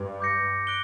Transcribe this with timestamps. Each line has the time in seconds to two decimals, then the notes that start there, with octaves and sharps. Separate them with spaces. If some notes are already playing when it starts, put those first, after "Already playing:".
Already playing: G2
0.20 D6 G6 A#6 C#7
0.67 F#6 D7 G7